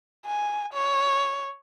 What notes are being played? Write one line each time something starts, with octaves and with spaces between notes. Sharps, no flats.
G#5
C#5